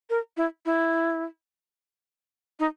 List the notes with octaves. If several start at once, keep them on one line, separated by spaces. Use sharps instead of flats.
A#4
E4
E4
D#4